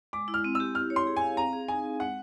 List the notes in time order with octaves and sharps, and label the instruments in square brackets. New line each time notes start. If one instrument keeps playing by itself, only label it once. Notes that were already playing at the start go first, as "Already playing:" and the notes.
[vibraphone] G#3 [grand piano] D6
[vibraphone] E4
[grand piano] F6
[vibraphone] C4
[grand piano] E6
[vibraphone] G4
[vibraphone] E4 [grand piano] F6
[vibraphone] C#5
[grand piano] C6
[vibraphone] G#4
[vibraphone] F5 [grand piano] G#5
[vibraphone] C4 [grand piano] A#5
[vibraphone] G#4
[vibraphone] D#4 [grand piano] G#5
[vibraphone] C4
[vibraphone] G#3 [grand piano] F#5